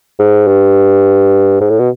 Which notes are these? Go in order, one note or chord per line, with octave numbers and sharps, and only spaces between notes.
G#2
G2
G#2
A2
B2